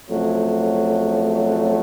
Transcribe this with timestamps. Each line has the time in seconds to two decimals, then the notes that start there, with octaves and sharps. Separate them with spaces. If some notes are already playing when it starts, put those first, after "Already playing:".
0.10 F2 C#3 F#3 A3